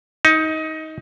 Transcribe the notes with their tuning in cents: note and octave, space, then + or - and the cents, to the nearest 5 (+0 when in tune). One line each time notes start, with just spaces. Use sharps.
D#4 +20